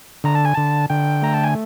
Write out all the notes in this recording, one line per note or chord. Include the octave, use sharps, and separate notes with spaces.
D3 A#5
A5
G#5
D3 A5
D3 G5
A3 A#5
A5
G#5